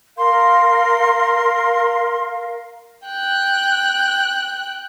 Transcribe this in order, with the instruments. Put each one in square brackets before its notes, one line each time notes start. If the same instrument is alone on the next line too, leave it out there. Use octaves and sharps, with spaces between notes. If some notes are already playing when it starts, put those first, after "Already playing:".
[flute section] A#4 F5 [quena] C6
[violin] G5 F#6